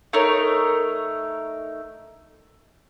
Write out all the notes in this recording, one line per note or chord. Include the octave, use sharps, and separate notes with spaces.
A3 D#4 A#4 C#5